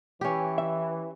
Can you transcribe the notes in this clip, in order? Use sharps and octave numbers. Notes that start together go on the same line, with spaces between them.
E3 C#4 G4
E5